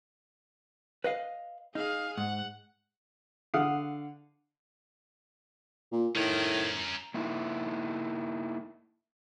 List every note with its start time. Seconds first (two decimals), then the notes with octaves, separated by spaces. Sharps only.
1.04 B4 D#5 F5
1.75 D#4 G#4 F5
2.17 G#2 F#5
3.54 D3 F5 F#5 D#6
5.92 A#2
6.15 A2 D#3 C#4 A#4
7.14 A#3 D#4 E4